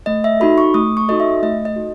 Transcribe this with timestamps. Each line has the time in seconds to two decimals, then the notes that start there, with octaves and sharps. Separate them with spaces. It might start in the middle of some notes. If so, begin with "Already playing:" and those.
0.06 A3 D#5
0.24 E5
0.40 D#4 F#4 A4 B5
0.58 C#6
0.74 A3 D#6
0.97 C#6
1.08 D#4 F#4 A4 D#5
1.20 E5
1.43 A3 D#5
1.65 D#5
1.76 D#4 F#4 A4